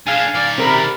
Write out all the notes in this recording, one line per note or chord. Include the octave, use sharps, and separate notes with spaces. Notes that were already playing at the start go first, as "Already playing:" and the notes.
D4 G#4 F5 G#5
D#3 D5
C3 A#4 B5